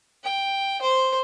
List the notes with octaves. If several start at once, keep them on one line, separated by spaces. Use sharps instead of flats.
G5
C5